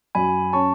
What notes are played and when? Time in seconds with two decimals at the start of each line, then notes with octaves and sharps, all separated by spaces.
0.15 F#2 G#5 B5
0.53 C#4 A5 C#6